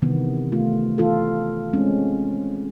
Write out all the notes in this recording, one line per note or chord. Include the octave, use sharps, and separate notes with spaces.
C3 D#3 E3 G3 B3
A3 F4
E3 F4 A4
G#3 C4 C#4